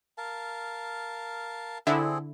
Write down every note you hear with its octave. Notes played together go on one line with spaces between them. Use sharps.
A#4 F5 A5
D3 C4 E4 G#4 A4